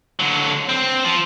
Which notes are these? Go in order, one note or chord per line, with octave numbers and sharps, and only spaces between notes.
D3 F#3
C4
F3